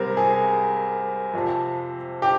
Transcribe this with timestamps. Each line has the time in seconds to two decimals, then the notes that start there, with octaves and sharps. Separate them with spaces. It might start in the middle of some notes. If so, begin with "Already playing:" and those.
Already playing: C2 C3 G3 C4 A#4
0.17 G#4
1.34 F2 C3 F3
2.22 G4